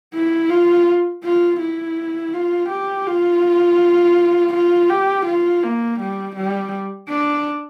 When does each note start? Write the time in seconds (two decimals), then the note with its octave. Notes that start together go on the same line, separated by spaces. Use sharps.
0.14 E4
0.50 F4
1.24 F4
1.60 E4
2.33 F4
2.69 G4
3.06 F4
4.53 F4
4.89 G4
5.26 F4
5.63 A#3
6.00 G3
6.36 G3
7.09 D4